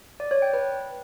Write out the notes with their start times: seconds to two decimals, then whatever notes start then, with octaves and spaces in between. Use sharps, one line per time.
0.20 D5
0.31 C#5
0.42 G5
0.54 B4